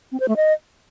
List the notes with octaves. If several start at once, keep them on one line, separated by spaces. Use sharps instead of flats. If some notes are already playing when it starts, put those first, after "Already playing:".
C4
C5
A3
D#5